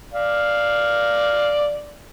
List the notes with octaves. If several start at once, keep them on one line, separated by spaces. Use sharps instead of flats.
D5 F5